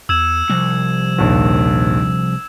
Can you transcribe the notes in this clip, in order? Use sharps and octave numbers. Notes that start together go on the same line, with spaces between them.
E2 E6 G#6 E7
C2 F3
A#1 D#2